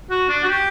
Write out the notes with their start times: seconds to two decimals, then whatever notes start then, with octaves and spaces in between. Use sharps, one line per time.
0.10 F#4
0.29 D4
0.43 F#4
0.48 G4